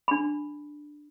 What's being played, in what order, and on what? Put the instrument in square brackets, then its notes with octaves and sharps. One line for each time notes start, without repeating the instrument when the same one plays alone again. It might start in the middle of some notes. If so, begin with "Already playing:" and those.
[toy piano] D4 B5